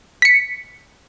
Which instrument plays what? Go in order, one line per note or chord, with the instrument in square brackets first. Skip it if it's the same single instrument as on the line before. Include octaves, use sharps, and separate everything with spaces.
[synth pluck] B6 C#7